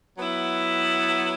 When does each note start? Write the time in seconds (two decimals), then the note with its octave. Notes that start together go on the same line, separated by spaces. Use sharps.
0.17 F#3 B3 E4